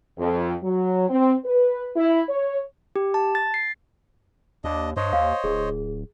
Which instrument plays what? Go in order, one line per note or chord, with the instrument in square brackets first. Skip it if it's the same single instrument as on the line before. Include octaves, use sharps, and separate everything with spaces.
[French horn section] F2
F#3
C4
B4
E4
C#5
[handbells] G4
A5
A6
C7
[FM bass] D#2 [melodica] D4 D#5
[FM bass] G2 [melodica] C5 C#5 D#5
[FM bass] D#2 [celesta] F5
[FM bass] D1 [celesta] G#4